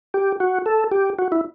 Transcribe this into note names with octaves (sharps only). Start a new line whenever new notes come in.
G4
F#4
A4
G4
F#4
E4